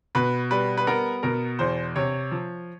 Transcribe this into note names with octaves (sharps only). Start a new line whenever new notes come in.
B2 B4
G3 B4
B4
B3 A#4
B2 A#4
E2 C5
C3 C#5
F3